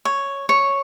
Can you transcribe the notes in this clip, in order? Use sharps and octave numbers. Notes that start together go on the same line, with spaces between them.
C#5
C#5